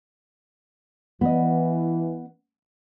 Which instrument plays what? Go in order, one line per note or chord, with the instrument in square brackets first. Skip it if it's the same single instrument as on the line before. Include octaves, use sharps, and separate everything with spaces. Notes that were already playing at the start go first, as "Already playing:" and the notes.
[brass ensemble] E3 [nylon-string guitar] B3 D#5